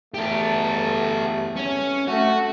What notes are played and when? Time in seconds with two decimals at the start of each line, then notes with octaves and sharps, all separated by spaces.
0.14 E2 A3 G4 A4
1.57 C#4
2.08 A3 F#4